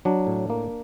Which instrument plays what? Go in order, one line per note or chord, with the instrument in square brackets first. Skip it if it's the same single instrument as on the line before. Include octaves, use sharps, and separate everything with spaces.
[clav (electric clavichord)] F#3 D4
A2
A#3